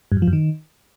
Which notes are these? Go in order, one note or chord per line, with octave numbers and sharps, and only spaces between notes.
G2
F#2
F3
F#2
D#3